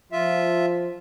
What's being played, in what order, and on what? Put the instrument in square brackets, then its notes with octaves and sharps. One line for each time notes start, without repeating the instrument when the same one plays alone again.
[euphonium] F3 [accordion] F4 E5